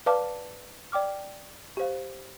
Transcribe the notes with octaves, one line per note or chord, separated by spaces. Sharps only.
B4 D5 F5 A5 D6
D5 G5 D6 F6
G4 C5 F5